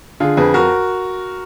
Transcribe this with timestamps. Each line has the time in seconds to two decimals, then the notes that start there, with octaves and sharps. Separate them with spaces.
0.20 D3 F4 G#4
0.37 F2 G#4 B4
0.54 F#4 A#4